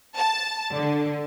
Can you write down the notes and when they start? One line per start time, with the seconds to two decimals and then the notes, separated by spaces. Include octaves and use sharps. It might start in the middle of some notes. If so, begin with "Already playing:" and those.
0.15 A5
0.75 D3